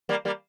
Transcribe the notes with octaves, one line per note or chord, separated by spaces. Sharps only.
G3 A#3
G3 A#3